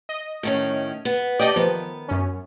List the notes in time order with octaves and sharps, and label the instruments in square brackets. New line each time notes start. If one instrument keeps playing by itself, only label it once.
[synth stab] D#5
[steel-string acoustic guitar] A2 D#3 C#4
B3
[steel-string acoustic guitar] G4 A4 D5 [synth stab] D#5 G5 D6
[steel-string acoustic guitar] D#3 B3 [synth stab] F3
[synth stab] F#2 C#4